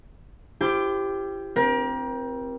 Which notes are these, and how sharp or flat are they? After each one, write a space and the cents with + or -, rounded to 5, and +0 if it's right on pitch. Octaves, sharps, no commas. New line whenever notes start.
E4 +45 G4 +5 C5 -5
C4 +0 A#4 +35